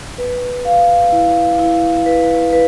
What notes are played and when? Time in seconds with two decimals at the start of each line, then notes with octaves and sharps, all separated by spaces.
0.18 B4
0.65 F5
1.12 E4
1.59 E4
2.06 B4
2.53 B4